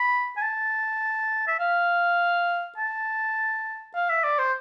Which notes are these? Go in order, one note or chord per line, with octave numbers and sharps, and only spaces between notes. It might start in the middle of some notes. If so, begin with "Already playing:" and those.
Already playing: B5
G#5
A5
E5
F5
A5
F5
E5
D5
C5